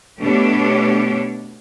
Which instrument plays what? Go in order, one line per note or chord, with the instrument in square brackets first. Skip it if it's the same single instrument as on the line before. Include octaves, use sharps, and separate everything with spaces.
[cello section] B2 A3 D4 G4 C#5